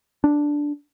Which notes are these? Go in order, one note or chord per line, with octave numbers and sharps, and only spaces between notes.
D4